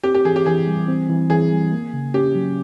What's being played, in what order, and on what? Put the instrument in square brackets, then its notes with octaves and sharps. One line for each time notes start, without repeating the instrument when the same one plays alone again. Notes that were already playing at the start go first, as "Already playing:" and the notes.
[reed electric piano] C4 [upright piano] G4
[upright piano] G4
[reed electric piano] E3 [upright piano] G#4
[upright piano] G4
[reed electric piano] E3 [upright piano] G#4
[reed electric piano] G3
C4
E3
[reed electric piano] E3 [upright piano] G#4
[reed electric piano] G3
A#3
C#3
[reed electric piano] C#4 [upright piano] G4
[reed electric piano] F#3